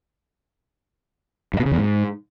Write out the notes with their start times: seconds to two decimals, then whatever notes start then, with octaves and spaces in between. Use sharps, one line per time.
1.54 G2
1.60 B2
1.66 C#3
1.72 E2
1.78 G#2